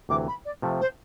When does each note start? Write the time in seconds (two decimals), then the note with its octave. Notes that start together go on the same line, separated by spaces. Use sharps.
0.09 D2 C3 E3 D6
0.27 B5
0.45 D5
0.62 C3 F3 A3
0.80 C5